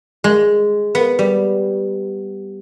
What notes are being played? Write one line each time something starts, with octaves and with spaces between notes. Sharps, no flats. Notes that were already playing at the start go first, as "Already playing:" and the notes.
G#3
B3
G3